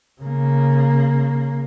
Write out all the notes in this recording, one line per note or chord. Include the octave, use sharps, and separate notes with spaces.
C#3 A#3